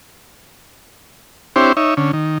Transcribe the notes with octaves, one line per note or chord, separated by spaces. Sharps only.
C4 D4 E4 G4 C5 C#5
D#4 C#5 E5
D3 C#4
D#3